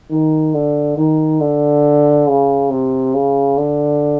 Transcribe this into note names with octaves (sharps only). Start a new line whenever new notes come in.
D#3
D3
D#3
D3
C#3
C3
C#3
D3